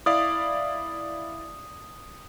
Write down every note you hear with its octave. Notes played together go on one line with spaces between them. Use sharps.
E4 D5 F5 D#6